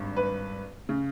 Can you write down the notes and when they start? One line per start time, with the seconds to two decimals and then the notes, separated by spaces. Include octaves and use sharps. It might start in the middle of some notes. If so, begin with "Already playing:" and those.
Already playing: G#1 G2
0.17 B4
0.89 C#3